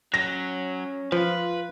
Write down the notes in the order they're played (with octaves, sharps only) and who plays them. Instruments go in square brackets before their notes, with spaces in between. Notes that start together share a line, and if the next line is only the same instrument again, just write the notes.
[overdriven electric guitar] F#3 [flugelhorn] C#4 [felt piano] A#6
[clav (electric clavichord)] F3 [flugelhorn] F4 [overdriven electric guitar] B4